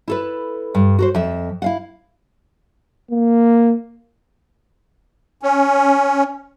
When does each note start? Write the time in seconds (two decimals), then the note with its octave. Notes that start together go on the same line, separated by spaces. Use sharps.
0.08 E4 A4 B4
0.75 G2
0.99 F#4 A#4 C5
1.15 F2 E5
1.62 E4 F5 F#5
3.12 A#3
5.43 C#4